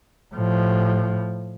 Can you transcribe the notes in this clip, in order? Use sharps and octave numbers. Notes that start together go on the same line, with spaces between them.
A2 F3